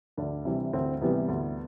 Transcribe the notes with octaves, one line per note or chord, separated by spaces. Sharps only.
D2 D4
C3 E3 G3
D2 C4
C3 E3 G3 B3
D2